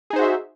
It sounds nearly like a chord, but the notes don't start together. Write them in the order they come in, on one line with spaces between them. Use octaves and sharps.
G#4 D#4 C5 F#4 E5